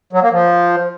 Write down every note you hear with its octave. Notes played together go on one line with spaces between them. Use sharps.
F#3
A#3
F3